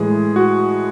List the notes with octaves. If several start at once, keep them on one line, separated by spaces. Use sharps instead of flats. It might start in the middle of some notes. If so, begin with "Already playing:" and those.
Already playing: A2 E3 G#3 G#4
F#4